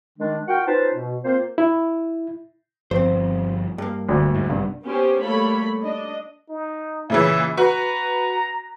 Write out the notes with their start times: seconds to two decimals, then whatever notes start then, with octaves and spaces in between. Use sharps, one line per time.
0.19 D#3 G#3 D4
0.48 F4 F#4 A#4 F#5 G5
0.66 C#4 D#4 F4 B4 C5 A5
0.94 B2
1.24 A#3 C4 F4 C5
1.58 E4
2.91 G1 G2 F3 C4 C5
3.78 G2 A#3
4.09 D1 D2
4.35 G#2
4.49 G#1 G2 C3 B3
4.85 B3 C#4 G4 C5
5.21 G3 A3 A#3 A4 C#5 B5
5.83 D4 D#5
6.50 D#4
7.10 A#2 C#3 E3 E5
7.57 F#4 B4 A#5 F#6